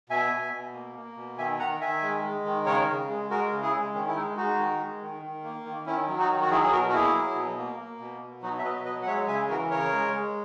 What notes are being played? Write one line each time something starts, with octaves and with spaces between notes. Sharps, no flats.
B2 E5 G#5
B2
B2
A#3
A#3
B2
D#3 E5 G#5
D#3 F#5 A#5
D#3 E5 G#5
G#3
G#3
D#3
C#3 A#4 C#5
C#3
G#3
G#3 F#4 A#4
C#3
E4 G#4
G#3
D#3 C#4
E4
G#3 D#4
G#3 D#4 F#4
D#3
G#3
D#3
D#3
A#3
D#3
D#3 C#4 E4
F#3
D#4 F#4
D#3
F#4
F#3 E4 G#4
G#4
B2 F#4 A#4
F#4
A#3 E4 G#4
F#3
B2
A#3
A#3
B2
B2
F#3 D#4 F#4
E5
B2 B4 D#5
F#3 B4 D#5
F#5
G#3 C#5 E5
C#3 E5 G#5
E3 F#4 A#4
C#3 A#4 C#5
G#3
G#3